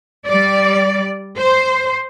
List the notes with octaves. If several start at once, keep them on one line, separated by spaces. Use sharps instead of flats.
G3 D5
C5